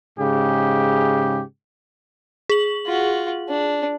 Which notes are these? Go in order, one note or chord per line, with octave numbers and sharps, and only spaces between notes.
G#2 C#3 G4
G#4 F#7
F4 F#4
D4